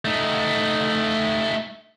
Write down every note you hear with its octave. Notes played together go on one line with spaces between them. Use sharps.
A3 D#4